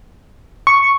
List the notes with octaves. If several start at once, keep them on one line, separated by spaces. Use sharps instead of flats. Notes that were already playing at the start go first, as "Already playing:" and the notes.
C#6